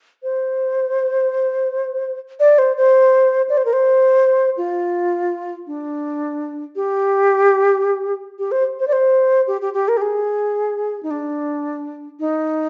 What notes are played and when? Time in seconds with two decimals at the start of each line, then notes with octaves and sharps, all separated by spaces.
0.23 C5
2.40 D5
2.58 C5
2.77 C5
3.49 D5
3.57 C5
3.65 A#4
3.73 C5
4.57 F4
5.67 D4
6.76 G4
8.39 G4
8.52 C5
8.80 C5
8.88 D5
8.93 C5
9.47 G4
9.61 G4
9.74 G4
9.88 A#4
9.97 G4
10.01 G#4
11.03 D#4
11.11 D4
12.20 D#4